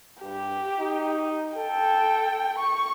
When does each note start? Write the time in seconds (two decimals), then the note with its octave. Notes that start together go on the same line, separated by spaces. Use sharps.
0.23 G2 G4
0.79 D#4
1.57 A4 G5
2.58 C#6